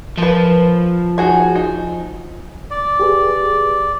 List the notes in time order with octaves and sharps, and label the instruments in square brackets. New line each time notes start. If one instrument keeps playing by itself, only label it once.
[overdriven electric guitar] F3 [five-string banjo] A#4 B4
[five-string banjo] D#4 F#4 G#4
D#4
[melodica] D5
[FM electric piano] G4 G#4 B4